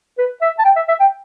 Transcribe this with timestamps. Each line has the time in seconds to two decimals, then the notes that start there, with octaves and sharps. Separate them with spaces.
0.18 B4
0.42 E5
0.59 A5
0.65 G5
0.76 E5
0.88 E5
1.00 G5